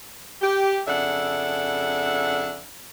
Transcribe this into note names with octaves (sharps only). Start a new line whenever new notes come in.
G4
F2 C#3 D4 A4 E5 F#5